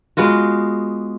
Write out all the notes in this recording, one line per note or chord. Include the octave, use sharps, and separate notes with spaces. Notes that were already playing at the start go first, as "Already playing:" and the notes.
G#3 B3 F4 F#4